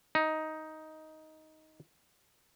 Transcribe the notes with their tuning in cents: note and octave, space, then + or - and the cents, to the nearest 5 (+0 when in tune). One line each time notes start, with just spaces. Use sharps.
D#4 +10